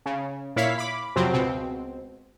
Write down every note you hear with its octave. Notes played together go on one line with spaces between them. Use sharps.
C#3
A#2 E4 C#5 F5 B6
B5 D6
F2 C3 F3 F#3 C4
C#2 B2 C4